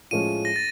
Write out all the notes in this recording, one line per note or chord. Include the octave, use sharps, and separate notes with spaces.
A2 F3 G#3 C#4 F4 D#7
A#6
A6